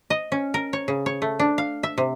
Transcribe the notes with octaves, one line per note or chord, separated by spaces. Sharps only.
D#5
C#4
A#4
C#5
C#3
C#5
A3
D4
F5
E5
C3